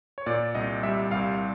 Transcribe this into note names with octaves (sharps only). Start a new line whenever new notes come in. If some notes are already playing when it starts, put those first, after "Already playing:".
C#5
A#2 D5
C2 D#5
G3 E5
C2 F5